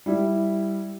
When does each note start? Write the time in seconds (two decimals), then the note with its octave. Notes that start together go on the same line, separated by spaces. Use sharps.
0.06 G3 E4